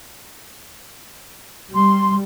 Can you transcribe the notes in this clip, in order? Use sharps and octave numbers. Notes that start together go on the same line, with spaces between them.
G3 C6